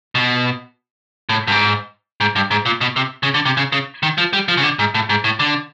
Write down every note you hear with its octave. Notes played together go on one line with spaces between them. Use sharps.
B2
A2
G2
G#2
G#2
G2
G#2
A#2
B2
C3
C#3
D3
C3
C#3
C#3
D#3
F3
G3
F3
C#3
D3
G#2
A2
G#2
A2
D3